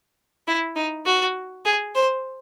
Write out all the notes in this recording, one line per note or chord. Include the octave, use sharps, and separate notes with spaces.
E4
D#4
F#4
G#4
C5